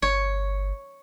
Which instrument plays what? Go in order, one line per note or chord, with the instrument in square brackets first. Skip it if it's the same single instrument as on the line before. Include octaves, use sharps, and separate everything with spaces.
[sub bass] G1 [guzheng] C#5